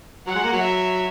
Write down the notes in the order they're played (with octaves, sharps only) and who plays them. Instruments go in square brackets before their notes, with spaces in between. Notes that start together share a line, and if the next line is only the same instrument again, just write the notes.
[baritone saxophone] F#3 [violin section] F#5
[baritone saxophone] G#3
A#3
F#3
[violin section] E5